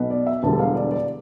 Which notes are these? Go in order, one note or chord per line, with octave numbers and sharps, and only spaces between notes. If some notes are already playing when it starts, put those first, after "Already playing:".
Already playing: B1 B2 B3
D5
E5
E1 E2 D3 G3 A5
F5
D5
D5